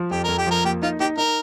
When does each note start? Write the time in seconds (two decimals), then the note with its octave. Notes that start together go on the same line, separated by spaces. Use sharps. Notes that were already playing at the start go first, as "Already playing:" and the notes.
Already playing: F3
0.11 F2 G4
0.24 F2 A#4
0.38 G4
0.47 F3 A#4
0.64 A#3 G4
0.82 D#4 F4
1.00 D#4 G4
1.18 D#4 A#4